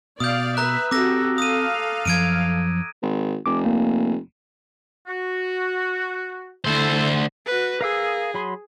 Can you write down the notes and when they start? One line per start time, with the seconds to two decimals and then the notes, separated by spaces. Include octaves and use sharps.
0.20 B2 D5 F5 D#6 G6
0.57 B4 E5 A#5 F#6
0.91 C4 F#4 G4 A4 D6 E6 A#6
1.38 A4 F5 D#6 D#7
2.05 F#2 F3 G#6 D7 D#7
3.02 G#1
3.46 F1 D6
3.65 A#3
5.07 F#4
6.65 D2 A3 E4 A4 C5
7.46 F#4 B4
7.81 G#4 A#4 F5 E6
8.34 F#3 B5 C6